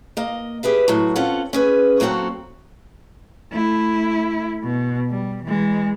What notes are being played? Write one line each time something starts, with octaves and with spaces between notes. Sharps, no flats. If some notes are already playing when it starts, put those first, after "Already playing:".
A#3 D#5
G4 G#4 B4 E5
A2 F#3 F#4
C4 C#4 F4 A4 F#5
C#4 G#4 B4
F#3 A#3 C4 C#4 F#4 A4
A3 E4
B2
G3
E3 G#3